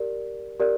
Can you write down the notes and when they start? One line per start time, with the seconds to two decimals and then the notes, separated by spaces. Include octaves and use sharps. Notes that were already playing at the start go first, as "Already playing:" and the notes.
Already playing: G4 A#4 D5
0.60 G4 A#4 D5